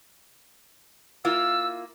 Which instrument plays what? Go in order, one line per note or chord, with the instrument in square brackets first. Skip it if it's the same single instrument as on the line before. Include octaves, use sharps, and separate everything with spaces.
[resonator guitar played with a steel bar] A#3 E4 F4 [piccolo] E6